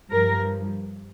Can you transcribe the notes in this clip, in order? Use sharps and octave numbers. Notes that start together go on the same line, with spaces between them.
G2 F3 A#4